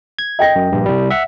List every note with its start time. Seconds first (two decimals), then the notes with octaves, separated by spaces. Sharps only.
0.19 G#6
0.39 D#5 G5 A#6
0.56 F#2
0.72 A#1 G2
0.86 C2 G3
1.10 E5 F#5